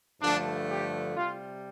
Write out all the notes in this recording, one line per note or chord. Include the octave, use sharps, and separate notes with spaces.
G2 D3 F3 A3 D4
G4
C3 G3 F4